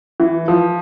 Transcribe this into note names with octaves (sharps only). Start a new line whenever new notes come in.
E3
F3